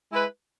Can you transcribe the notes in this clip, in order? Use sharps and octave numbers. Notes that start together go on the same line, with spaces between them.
G#3 E4 B4